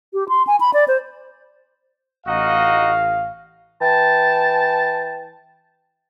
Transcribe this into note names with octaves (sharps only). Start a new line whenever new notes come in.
G4
C6
G#5
B5
D5
C5
A1 D#4 F#4 D#5 F5
E3 G5 A5